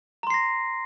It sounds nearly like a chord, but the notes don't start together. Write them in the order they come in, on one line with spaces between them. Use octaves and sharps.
A#5 C6 C7 A#6